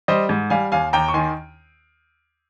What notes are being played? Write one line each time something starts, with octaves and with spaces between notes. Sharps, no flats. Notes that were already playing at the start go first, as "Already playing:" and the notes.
G3 C5 D#5
G#2
G3 F5 G#5
D#2 F5 G#5
D#2 G5 A#5
C#6
D#3 G#5 C6